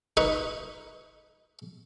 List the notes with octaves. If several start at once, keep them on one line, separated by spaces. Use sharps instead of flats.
D#4 B4 C#6